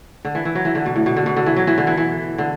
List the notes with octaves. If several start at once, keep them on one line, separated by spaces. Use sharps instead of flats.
D3
E3
E3
F#3
E3
D3
B2
A2
B2
D3
B2
D3
E3
F#3
E3
D3
E3
E3
D3